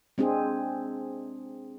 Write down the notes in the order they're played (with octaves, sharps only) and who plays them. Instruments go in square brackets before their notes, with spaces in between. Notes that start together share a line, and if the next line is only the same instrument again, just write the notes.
[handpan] G#3 C4 D4 G#4